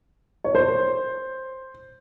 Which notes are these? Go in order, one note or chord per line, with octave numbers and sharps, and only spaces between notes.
C#5
C5